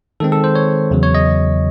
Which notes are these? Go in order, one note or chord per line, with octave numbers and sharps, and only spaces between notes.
D#3 G#3 C4 A4
A4
C5
C#5
E2 C#3 F#3
C#5
D#5